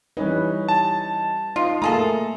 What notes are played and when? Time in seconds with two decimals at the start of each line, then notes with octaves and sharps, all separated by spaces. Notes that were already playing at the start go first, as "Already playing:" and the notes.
0.17 E3 G3 C#4 D#4 B4
0.69 A5
1.56 D#4 F4 D#5
1.82 A3 A#3 F4 G#4 A4 A#5